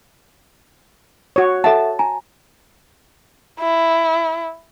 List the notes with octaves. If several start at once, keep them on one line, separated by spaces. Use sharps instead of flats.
F#4 C#5
A4 E5 F#5 A5
G#5 A#5
E4